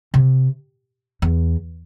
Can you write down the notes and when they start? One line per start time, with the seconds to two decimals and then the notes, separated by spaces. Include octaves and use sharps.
0.14 C3
1.22 E2